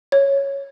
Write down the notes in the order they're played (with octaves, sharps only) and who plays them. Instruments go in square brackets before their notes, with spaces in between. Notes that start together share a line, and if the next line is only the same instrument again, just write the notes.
[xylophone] C#5